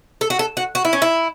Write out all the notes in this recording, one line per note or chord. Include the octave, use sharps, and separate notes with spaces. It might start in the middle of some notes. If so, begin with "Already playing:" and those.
A4
F#4
A4
F#4
F#4
E4
C#4
E4